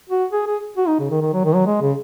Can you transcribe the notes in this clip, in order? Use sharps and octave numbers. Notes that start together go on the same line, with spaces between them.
F#4
G#4
G#4
F#4
D#4
C#3
D#3
D#3
F#3
D#3
F#3
G#3
C#3